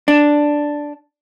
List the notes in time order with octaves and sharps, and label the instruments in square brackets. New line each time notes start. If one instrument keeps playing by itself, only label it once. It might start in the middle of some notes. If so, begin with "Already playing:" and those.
[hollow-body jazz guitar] D4